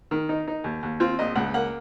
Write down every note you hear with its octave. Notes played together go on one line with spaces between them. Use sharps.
D#3
D#4
D#4
D#2
D#2
C4 F4
A#1 D#5
C#2 F#5
A#3 F#5